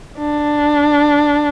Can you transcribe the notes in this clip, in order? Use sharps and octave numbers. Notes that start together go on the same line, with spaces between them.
D4